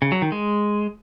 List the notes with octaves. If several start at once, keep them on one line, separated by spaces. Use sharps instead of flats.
C#3
F#3
D#3
G#3